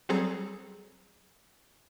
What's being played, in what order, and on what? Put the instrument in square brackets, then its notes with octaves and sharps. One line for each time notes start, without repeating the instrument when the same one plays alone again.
[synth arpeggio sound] F#3 G3 C4 G#4 A4 A#5